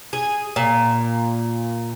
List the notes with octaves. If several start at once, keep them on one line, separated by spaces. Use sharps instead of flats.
G#4
A#2